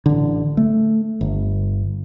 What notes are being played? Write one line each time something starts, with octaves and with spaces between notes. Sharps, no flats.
A1 D3
A3
G1